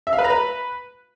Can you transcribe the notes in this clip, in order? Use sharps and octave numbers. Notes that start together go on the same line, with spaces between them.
E5
F5
B4
A#5
B4